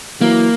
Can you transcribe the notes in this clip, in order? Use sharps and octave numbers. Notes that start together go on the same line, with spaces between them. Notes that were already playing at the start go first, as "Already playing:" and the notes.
E3 F#3 A#3